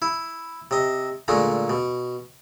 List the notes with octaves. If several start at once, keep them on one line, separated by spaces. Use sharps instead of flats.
E4
C3 D#5
A#2 D3 G#3 A3
B2